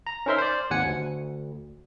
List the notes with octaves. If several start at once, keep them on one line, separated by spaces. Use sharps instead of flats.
A#5
C#4 D#4 A#4 C5 E5 C6
C5 D5
G#1 D#2 F#5 G#5 C#7
D2